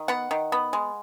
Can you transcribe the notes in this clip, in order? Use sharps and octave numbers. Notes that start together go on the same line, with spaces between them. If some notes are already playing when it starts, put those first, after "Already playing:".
Already playing: D#3
B3 F#5
D#3
B3
G#3